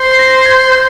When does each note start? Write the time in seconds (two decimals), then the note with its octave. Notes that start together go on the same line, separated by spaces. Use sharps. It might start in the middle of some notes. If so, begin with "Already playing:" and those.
Already playing: C5 C7
0.11 C7
0.19 A#6
0.38 A#6
0.46 G#6
0.72 G6